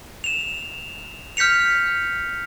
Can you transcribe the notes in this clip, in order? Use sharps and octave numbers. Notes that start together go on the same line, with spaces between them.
E7 F7
F6 G6 B6 C#7 F7